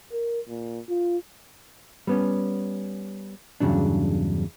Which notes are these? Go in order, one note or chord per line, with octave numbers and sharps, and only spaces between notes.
A#4
A#2
F4
G3 B3 C#4
E2 G2 A#2 C#3 F#3 D4